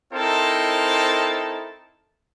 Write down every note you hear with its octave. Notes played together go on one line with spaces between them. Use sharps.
C4 D#4 E4 A4 A#4 C5